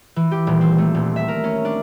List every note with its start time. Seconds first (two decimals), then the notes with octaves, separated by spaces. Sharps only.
0.16 E3
0.31 G4
0.47 D#1
0.61 C4
0.78 A3
0.94 D#1
1.16 E5
1.28 A#4
1.44 C#4
1.65 D4